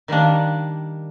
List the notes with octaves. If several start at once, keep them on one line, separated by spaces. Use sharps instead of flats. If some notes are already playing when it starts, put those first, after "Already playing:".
D#3 G3 A#3 D4